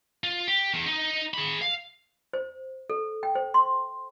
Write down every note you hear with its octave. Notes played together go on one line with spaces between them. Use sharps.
F4
G4
E2
D#4 D#5
G#4 B5
F5
C5
A4
G5
C5
C6